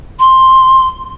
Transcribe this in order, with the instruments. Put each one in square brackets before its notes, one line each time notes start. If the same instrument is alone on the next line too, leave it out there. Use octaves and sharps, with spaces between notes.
[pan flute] C6